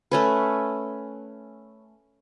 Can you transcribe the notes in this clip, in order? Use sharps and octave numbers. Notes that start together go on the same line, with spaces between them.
A3 C#4 B4